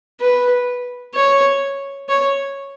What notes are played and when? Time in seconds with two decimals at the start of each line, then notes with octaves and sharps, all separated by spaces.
0.21 B4
1.14 C#5
2.09 C#5